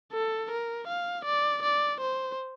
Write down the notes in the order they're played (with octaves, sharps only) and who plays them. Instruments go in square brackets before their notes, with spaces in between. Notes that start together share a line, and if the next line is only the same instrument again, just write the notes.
[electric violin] A4
A#4
F5
D5
D5
C5